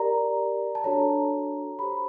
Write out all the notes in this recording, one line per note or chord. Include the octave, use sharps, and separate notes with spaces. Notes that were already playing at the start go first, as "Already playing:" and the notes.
Already playing: G4 A#4 D5 A#5
A5
D4 F#4 A4 C#5 A#5
G4 C5 B5